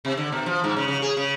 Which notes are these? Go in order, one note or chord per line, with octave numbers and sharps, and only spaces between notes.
C3
D3
B2
F3
G#2
C#3
C#3
G#4
C#3